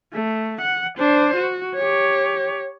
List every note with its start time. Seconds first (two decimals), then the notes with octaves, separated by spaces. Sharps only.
0.14 A3
0.62 F#5
0.98 D4 C5
1.36 F#4
1.75 G4 C#5